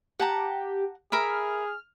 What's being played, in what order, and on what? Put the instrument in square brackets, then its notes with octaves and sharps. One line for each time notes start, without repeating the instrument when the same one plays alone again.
[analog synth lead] G4 [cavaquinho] F#5 A5 A#5
[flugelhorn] G#4 [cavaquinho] A#4 E5 B5 [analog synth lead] F6